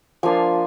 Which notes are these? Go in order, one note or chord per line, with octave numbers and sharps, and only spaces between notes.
F3 A#3 D4 F4 G#5